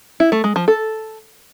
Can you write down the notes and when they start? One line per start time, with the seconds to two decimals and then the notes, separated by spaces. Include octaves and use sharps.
0.20 E4
0.32 A3
0.44 G#3
0.56 F3
0.68 A4